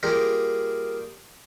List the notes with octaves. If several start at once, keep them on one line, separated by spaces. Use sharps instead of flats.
G3 A#3 F4 G#4 A#4 G5